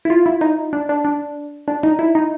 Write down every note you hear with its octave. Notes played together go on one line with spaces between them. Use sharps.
E4
F4
E4
D#4
D4
D4
D4
D4
D#4
E4
D#4